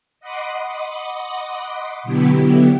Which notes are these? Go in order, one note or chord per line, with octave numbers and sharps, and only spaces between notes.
D#5 F#5 B5 C6 D6 D#6
B2 D3 F#3 B3 E4 G4